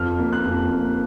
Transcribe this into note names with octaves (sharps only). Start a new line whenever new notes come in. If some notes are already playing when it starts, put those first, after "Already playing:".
Already playing: F2 F6
A#3
F#6
F2
A#3